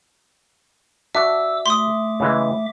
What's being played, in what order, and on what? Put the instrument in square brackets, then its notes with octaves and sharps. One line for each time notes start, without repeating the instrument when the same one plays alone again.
[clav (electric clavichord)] D4 F#4 [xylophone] E5 [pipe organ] D6 E6
[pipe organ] A3 E5 D6 [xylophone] C6 D#6
[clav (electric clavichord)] C#3 E3 G#3